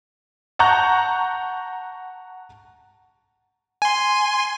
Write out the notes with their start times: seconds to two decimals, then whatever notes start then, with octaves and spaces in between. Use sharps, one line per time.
0.59 F#5 A5 A#5 C#6 F#6 G6
3.82 G#5 C6